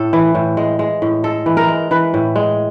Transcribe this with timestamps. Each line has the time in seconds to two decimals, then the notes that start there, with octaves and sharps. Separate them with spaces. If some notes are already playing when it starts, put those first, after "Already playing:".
Already playing: A2 A4
0.13 E3
0.35 A2
0.57 G#3
0.79 G#3
1.02 A2
1.24 G#3 A4
1.46 E3
1.57 A#4
1.68 G#3
1.91 E3 B4
2.14 A2
2.36 G#3